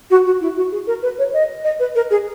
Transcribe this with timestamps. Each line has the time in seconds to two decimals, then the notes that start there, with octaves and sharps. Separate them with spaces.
0.10 F#4
0.25 F#4
0.41 E4
0.56 F#4
0.72 G#4
0.87 A#4
1.02 B4
1.18 C#5
1.33 D#5
1.64 D#5
1.79 B4
1.95 A#4
2.10 G#4